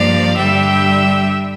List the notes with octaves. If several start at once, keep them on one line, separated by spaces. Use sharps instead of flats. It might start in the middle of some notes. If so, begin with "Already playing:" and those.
Already playing: G2 F3 A#3 D5 F5
G2 D3 G3 E5 G5